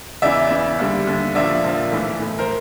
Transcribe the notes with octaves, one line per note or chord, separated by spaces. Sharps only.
E2 C#3 E3 D5 E5
E2 C#3 E3
D#2 D3 G3
D#2 D3 G3
A#1 A#2 F3 D5 E5
A#1 A#2 F3
B1 A2 E3
B1 A2 E3
A#4 C5